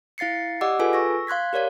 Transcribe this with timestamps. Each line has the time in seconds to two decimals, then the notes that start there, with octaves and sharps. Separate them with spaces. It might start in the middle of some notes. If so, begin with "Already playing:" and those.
0.18 E4 F5 A6 C7 C#7
0.61 G4 D5 D#5 F#5 D6 E6
0.79 F4 G#4 A4 B4 G#5
0.93 C#6 E6 A#6
1.27 F5 C6 F#6 G#6 B6
1.53 G4 A#4 C#5 D5 F5